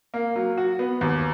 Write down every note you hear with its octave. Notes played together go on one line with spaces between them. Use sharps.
A#3
F#3
F#4
B3
D#2